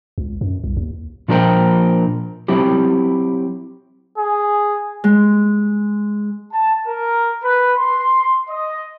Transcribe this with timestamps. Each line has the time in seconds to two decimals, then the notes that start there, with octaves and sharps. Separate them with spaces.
0.18 C#2
0.41 F#2
0.64 C2
0.77 D#2
1.28 A#2 F3 D4 A#4 C5 G5
2.48 F#3 C4 E4 G4
4.18 G#4
5.04 G#3
6.53 A5
6.86 A#4
7.43 B4
7.77 C6
8.49 D#5